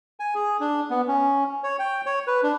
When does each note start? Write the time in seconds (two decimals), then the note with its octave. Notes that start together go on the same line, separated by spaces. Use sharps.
0.20 G#5
0.35 G#4
0.60 D4
0.90 B3
1.08 C#4
1.64 C#5
1.79 G5
2.06 C#5
2.27 B4
2.43 D4